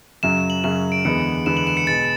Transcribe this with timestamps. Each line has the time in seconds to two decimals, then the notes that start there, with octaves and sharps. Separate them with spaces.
0.23 F#2 C#3 F#3 E7
0.50 F#7
0.64 F#2 C#3 F#3 E7
0.92 D7
1.05 E2 D3 G#3 B3 C#7
1.46 E2 D3 G#3 B3 E7
1.57 F#7
1.67 E7
1.77 C#7
1.87 B2 G#3 B3 A6